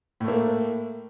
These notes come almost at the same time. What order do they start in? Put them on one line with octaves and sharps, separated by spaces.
A2 A3 A#3